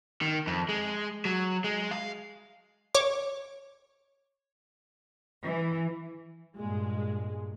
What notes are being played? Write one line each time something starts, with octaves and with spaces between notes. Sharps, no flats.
D#3
F2
G#3
F#3
G#3
F5
C#5 D6
E3
G2 A#2 G#3